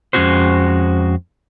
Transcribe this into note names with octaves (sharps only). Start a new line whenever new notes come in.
F2 G#3 C#4 E4 F#4 C5